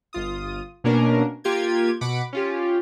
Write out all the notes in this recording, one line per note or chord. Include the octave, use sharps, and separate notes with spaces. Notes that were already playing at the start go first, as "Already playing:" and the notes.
G1 F4 D#6
B2 A#3 C#4 D4 A#4
A#3 F4 G4 G5 G#6
B2 F#5 B5 D6
C#4 F4 G4